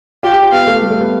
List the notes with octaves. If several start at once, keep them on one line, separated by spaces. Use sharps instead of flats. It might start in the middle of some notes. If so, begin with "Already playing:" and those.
F4 G4
G4
F4
B3 F5
A3
G3
A3
B3